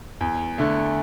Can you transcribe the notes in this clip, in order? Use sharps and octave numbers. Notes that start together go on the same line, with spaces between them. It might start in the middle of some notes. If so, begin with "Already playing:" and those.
E2
D3 A3